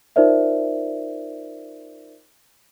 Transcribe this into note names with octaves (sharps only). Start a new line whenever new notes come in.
D#4 F4 A#4 C5 D5 E5